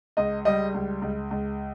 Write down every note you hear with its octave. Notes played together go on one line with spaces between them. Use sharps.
C#2 D#5
G3 D#5
C#2
C#2
C#2